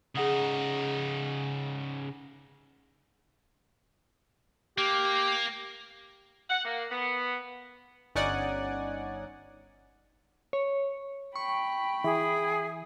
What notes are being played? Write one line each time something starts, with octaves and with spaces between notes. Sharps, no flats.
C#3 D#4 G#4 F#5 D#6
A#3 G4
F#5
A#3
B3
G1 C#4 D#4 D5 F#5 G#5
C#5
G5 B5 C#6
E3 G#4